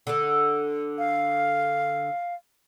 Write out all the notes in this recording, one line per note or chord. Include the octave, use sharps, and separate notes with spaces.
D3 A4
F5